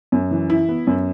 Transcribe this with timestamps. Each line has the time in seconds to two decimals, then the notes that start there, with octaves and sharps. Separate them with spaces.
0.12 F#2
0.31 E3
0.50 E4
0.69 B3
0.87 F#2